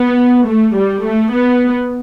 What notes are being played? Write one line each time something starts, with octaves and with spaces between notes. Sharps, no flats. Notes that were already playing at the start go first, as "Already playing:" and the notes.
Already playing: B3
A3
G3
A3
B3